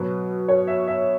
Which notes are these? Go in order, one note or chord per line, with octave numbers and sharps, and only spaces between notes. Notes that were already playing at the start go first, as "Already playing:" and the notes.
Already playing: B2 F#3 B4
C#5
E5
E5